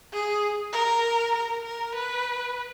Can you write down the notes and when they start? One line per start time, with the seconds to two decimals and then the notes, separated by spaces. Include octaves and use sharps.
0.12 G#4
0.73 A#4
1.35 A#4
1.64 A#4
1.95 B4